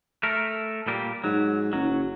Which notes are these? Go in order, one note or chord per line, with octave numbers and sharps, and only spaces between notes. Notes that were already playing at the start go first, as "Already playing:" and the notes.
A3 A#4
A#2 G3 A#3
G#2 F#3
F#1 F#3